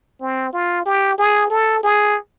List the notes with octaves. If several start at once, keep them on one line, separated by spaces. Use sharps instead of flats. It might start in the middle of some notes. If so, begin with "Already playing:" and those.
C4
F4
G4
G#4
A4
G#4